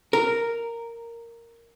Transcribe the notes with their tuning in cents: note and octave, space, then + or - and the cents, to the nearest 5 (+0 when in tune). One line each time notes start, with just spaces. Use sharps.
A#4 -5